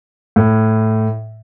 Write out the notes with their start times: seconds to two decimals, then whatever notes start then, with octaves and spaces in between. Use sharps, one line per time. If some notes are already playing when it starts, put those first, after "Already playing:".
0.36 A2